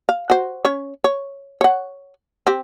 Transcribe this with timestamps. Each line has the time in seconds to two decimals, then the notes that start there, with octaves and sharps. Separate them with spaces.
0.09 F5
0.30 F#4 C5
0.65 C#4 C#5
1.04 C#5
1.61 C#5 F#5
2.47 C4 G4